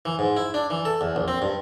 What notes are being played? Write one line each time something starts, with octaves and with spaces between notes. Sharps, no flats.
E3
G#2
E4
D4
E3
A4
E2
A#1
C4
G2